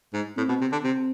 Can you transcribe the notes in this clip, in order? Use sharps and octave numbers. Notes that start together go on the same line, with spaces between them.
G#2
A2 C4
B2
C3
D3
C3 C4